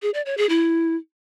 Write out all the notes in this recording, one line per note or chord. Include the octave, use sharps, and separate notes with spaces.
G#4
D5
C#5
G#4
E4